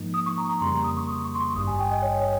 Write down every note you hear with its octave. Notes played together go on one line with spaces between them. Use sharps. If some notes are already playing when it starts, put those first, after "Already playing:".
Already playing: G#2 F3 A#3 D#4
D#6
C#6
A#5
A#5
F2 C#3 G3 A#3 C6
D#6
C#6
D#6
C#6
C6
C#6
G#1 G2 G3 D#6
G#5
G5
D#5
C#5
C#5